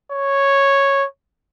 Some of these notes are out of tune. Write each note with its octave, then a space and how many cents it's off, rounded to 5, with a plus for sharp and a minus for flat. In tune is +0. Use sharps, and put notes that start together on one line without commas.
C#5 -5